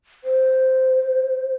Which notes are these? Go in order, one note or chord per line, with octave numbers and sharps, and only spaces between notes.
C5